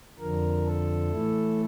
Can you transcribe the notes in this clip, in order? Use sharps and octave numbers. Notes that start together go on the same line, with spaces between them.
F2 D3 F3 A#4
A4
A2 E3 A3 E4